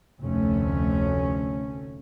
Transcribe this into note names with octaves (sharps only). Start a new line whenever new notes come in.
F1 D2 A3 C#4